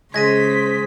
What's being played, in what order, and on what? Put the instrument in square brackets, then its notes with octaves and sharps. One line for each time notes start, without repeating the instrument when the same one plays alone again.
[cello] C#3 [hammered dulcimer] G#3 [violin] C5 B6 [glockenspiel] G#6 A#6 D#7